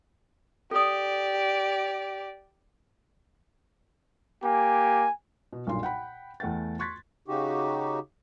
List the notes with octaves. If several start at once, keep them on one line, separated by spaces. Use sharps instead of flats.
G4 A4 D5 D#6
A#3 G4 G#5
B2
B1 G2 A#2 C6
F#5 G5 B5
E2 A3 F#5 G5 A6
C6 C#6 F#6 G#6 A6 B6
C#3 D#4 F#4 G4